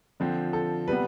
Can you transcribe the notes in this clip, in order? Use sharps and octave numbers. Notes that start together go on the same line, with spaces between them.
D3 F3 C4
A4
C3 G3 B3 B4